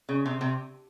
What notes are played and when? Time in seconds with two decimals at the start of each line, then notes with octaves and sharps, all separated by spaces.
0.09 C#3
0.26 C3
0.41 C3